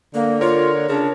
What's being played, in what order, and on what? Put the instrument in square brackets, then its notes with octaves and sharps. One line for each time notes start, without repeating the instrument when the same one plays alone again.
[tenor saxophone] D3 [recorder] A#3
[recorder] F4 [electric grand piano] A#4 C#5
[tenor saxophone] C#3 [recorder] D4